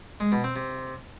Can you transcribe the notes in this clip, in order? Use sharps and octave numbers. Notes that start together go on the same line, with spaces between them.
G#3
B2
C4
C3